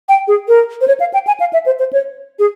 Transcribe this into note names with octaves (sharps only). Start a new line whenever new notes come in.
G5
G#4
A#4
C5
C#5
F5
G5
G#5
F5
E5
C5
C5
C#5
G#4